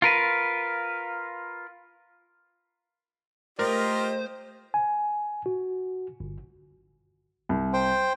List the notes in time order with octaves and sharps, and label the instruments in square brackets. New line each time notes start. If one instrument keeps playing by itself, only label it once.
[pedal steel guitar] F4 A#4 B4
[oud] A3 [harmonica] F4 G4 D#5 [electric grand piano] A#4 [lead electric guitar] C5
[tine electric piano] G#5
F#4
G1
[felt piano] C2
[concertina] C5 G5